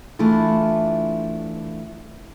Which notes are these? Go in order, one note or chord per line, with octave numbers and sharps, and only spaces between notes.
E3 A3 D4 E4 F4